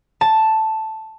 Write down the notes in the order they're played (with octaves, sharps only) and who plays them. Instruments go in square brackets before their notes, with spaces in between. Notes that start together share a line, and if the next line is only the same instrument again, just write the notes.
[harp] A5